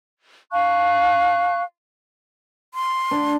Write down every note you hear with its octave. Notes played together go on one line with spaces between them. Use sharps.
F5 A5 C#6 F#6
C6
D4